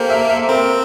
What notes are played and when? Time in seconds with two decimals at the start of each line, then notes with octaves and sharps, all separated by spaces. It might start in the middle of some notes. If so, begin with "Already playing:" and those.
Already playing: A#3 G4 A4 A#4 C5
0.10 E5
0.29 E5
0.49 C4 A#4